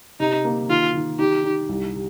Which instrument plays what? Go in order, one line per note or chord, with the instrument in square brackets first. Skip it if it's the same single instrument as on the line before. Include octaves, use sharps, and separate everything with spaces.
[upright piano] C3 [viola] D#4
[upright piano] A#3
[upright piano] D#3 [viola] F4
[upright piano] D#3
[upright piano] D#4 [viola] G4
[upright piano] D#4
C2
C3